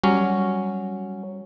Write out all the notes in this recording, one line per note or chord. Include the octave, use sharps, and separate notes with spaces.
F#3 G3 C#4